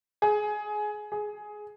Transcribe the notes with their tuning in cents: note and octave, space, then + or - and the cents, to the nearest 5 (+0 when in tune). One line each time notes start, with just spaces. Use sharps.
G#4 +20
G#4 +15